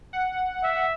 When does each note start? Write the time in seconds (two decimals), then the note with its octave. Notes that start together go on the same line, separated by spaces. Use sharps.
0.13 F#5
0.64 E5